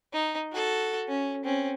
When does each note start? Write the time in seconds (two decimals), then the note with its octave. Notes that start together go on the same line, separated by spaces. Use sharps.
0.13 D#4
0.52 F#4 A4
1.08 C#4
1.45 C4 C#4